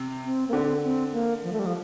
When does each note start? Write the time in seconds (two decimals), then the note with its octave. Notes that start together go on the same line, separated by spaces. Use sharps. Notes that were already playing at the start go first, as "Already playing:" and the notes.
Already playing: C3
0.24 C4
0.49 A#3
0.53 D3 C4
0.83 C4
1.13 A#3
1.43 F3
1.52 A3
1.59 G3
1.66 F3